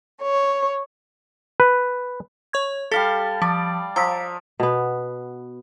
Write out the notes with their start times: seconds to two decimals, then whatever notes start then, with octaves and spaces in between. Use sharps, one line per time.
0.23 C#5
1.60 B4
2.53 C#5 C#6 G#6
2.91 G3 A4 F5 A5 B6
3.42 F3 D5
3.96 F3 A#5 E6 B6
4.60 B2 B3